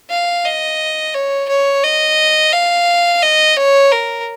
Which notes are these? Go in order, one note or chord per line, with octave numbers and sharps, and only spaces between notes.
F5
D#5
C#5
C#5
D#5
F5
D#5
C#5
A#4